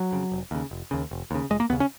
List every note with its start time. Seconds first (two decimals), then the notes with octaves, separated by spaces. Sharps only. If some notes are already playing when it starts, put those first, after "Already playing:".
Already playing: F#3
0.12 F2 C#3
0.32 F1
0.51 D#2 C#3
0.71 F1
0.91 D#2 C#3
1.11 F1
1.31 D#2 C#3
1.50 F1 G#3
1.60 A#3
1.70 D#2 B3
1.73 C#3
1.80 C#4